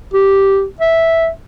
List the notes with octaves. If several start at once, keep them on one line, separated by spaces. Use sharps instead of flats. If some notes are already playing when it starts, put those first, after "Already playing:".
G4
E5